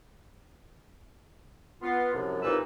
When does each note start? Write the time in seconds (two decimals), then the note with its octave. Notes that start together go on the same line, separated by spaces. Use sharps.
1.82 B3 F4
2.13 C2 F#2 C3 F3
2.42 C2 A#2 D#4 B4 E6